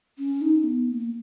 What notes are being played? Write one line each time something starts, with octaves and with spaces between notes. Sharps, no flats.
C#4
D#4
B3
B3
A#3